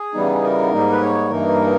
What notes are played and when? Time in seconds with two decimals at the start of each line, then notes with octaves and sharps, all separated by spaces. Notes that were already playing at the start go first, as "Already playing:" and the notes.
Already playing: G#4
0.14 C#3 E3 G3 B3 D#4
0.43 A#4
0.72 G#2 G3 A#3 D#4
0.92 B4
1.01 C#5
1.30 G2 E3 A#3 D#4 A#4